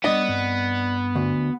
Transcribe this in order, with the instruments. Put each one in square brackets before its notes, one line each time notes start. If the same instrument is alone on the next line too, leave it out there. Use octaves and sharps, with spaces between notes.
[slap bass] G3 D4 [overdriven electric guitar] B3 [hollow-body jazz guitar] D5 D#5
[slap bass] G2 C4
[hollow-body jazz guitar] D2